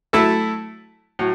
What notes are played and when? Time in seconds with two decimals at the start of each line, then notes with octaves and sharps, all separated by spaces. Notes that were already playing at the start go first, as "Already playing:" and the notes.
0.13 F#3 A3 E4 A4
1.19 A2 F#3